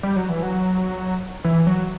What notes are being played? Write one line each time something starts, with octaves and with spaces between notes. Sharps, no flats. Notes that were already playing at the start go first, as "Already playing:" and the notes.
G3
F#3
E3
F#3
E3
F#3